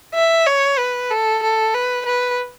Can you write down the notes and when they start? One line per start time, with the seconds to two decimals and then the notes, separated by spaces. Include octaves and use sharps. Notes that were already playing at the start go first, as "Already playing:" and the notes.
0.15 E5
0.47 C#5
0.78 B4
1.11 A4
1.43 A4
1.74 B4
2.06 B4